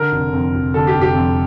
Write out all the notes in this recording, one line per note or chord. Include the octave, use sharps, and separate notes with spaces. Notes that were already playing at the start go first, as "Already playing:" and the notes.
Already playing: D3 A#4
F1
F2
F1
D3 A4
G4
F1
G4
F2